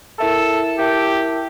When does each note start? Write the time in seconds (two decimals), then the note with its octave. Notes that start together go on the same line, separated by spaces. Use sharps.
0.18 E4 A4 A#4 E5 A5
0.79 E4 G4 A#4 E5 A5